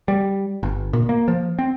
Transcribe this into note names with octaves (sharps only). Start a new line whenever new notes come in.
G3
G1
A#2
A#3
F3
C4